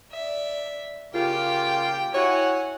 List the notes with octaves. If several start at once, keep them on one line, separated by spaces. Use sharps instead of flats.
D5 E5
C#3 A#3 F4 G4 G5
E4 F#4 C#5 F#5 G#5